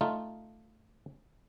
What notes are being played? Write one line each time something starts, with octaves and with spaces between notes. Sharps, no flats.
A3 D#4 F4